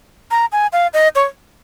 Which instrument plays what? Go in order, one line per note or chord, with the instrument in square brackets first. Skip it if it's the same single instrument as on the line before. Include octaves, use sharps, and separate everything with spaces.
[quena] A#5
G#5
F5
D#5
C#5